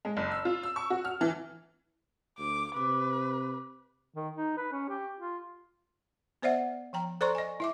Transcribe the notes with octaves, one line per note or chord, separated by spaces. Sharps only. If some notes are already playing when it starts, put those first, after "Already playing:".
G#3
F#1
E6
F4
E6
C#6
F#4
F6
E3
D2 D6
C3 B4 D6
D#3
D#4
B4
C#4
G4
F4
B3 C5 D5 E5 F#5
F3 G5 A#5
A4 C5 D5 A#5 C6 C#6
D#5 G#5
E4 E5 D6